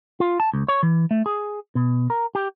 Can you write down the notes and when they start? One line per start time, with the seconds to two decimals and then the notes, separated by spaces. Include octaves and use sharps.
0.20 F4
0.40 A5
0.53 C#2
0.68 C#5
0.83 E3
1.11 A3
1.26 G#4
1.75 B2
2.10 A#4
2.35 G4